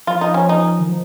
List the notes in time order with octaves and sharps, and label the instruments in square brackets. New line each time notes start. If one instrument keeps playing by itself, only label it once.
[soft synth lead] F3 [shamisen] F4
[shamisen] D#4
C#4
[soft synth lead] F3 [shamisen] D#4
[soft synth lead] D#3
F3